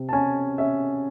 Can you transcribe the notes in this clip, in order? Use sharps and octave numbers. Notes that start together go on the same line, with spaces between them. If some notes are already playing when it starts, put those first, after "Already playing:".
Already playing: C3
A5
C#4 G#5
C#4 E5